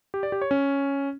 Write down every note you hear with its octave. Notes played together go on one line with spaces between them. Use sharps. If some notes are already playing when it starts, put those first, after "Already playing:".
G4
D5
G4
C#5
C#4